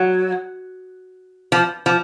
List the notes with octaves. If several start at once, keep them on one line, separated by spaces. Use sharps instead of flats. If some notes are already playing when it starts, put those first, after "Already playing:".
Already playing: F#3
F3
F3